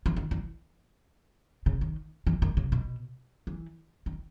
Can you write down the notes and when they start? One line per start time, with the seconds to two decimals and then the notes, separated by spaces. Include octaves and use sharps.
0.06 E3
0.16 D#3
0.31 E3
1.66 C#3
1.81 D#3
2.27 E3
2.42 D#3
2.57 C#3
2.72 B2
3.47 E3
4.06 D#3